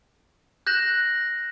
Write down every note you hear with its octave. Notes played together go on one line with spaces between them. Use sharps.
F#6 G6 A#6 E7 F#7